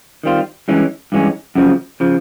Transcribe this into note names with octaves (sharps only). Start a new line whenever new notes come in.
D#3 G3 C4 F4
G2 E3 G#3 C#4
G2 E3 G#3 C#4
F#2 C#3 F3
C#3 F3